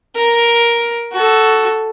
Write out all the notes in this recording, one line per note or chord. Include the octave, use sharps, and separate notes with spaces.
A#4
F#4 A4